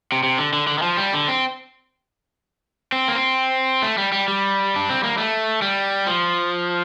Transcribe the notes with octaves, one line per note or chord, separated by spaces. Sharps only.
C3
C3
D3
D3
D3
D#3
F3
G3
D3
C4
C4
A#3
C4
A3
G3
G3
G3
D4
C4
A#3
A3
G3
F3